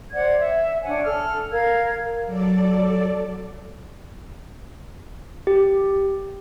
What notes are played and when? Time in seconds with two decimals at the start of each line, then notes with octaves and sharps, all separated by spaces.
0.13 C5 D5 F#5 G#6
0.38 E5
0.84 D4 C#5 F#5 G#5
1.04 A4 F6
1.52 A#4 F5 G#6
2.25 F#3 A4 D5
5.47 G4